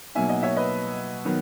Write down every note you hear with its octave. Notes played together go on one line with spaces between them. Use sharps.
B2 F#3 A#3 D#4 E5 G#5
D#5 F#5
C#5 E5
B4 D#5
D#3 F#3 B3